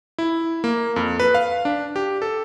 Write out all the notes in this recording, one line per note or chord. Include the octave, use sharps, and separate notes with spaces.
E4
A#3
F2
B4
F5
D4
G4
A4